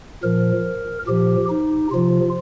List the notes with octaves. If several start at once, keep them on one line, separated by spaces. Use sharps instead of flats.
A#2 F3 A#4
A#2 F3 G4
D#4
C3 F3 F4